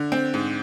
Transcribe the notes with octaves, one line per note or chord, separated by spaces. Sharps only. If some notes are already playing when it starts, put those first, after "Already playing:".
Already playing: D3
C4
G#2